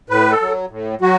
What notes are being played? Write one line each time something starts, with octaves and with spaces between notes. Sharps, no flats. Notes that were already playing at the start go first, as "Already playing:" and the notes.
A2 B4
A4
F#3
A2
F#3 F#4